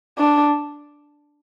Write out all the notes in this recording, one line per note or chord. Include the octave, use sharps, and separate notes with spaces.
D4